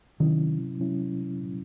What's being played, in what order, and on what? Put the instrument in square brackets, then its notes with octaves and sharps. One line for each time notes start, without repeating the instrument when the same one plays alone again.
[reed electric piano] C3 F#3 C#4 E4 [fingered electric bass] D#3
[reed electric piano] C3 F#3 C#4 E4